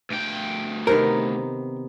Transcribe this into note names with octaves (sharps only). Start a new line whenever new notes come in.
D2 G5
C3 D#3 B3 A#4